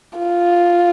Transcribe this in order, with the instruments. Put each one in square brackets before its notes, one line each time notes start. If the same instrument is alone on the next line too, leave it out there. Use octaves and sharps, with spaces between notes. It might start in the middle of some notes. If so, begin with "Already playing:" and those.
[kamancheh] F4